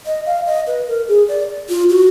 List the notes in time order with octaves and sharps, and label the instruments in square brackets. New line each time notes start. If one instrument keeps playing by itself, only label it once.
[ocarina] D#5
F5
D#5
B4
A#4
G#4
D5
F4
F#4